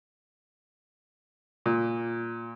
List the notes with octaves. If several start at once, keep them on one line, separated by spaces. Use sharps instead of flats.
A#2